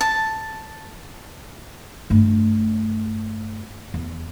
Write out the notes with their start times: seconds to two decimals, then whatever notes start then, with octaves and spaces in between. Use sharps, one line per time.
0.01 A5
2.10 G2 A3
3.94 E2